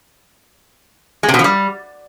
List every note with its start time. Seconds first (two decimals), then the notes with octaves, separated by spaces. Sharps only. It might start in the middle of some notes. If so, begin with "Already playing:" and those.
1.23 G#3
1.29 C3
1.34 B2
1.39 F3
1.44 G3